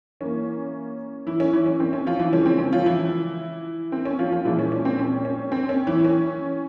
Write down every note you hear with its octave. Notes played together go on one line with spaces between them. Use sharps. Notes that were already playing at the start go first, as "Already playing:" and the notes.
E3 A#3 C#4
E3 E4
C#4
E3 E4
C#4
C4
C#4
F3 F4
E3 E4
C#3 F3 G#3 C#4
C4
C#4
F3 F4
E3 E4
C4
C#4
F3 F4
F3 F4
A#2 E3 F3 G#3 E4
C#4
C#4
C4
C#4
C#4
C4
C#4
E3 E4
E4
C#4